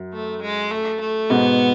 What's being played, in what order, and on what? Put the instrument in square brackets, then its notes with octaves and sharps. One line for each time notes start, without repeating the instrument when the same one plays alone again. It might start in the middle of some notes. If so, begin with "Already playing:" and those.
Already playing: [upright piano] F#2
[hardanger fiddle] A3
G#3
A3
A3
[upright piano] G#2 B2 [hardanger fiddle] B3